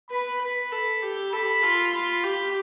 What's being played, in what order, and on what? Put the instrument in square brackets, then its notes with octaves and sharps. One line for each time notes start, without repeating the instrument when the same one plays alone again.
[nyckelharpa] B4 [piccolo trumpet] B5
[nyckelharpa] B4
A4
G4
[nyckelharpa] A4 [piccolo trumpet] B5
[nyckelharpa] F4
[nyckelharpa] F4 [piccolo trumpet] B5
[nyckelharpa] G4